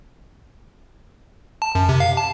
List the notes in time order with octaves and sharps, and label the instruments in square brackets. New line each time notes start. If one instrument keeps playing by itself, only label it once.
[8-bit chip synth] A5
F#2
C3
F5
A5